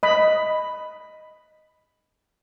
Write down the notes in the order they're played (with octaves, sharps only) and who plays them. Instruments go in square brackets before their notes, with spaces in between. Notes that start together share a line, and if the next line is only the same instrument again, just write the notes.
[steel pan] D#5 B5